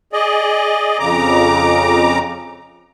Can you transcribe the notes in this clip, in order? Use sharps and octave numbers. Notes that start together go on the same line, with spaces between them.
G#4 D5 D#5
F2 C#3 A#5 D6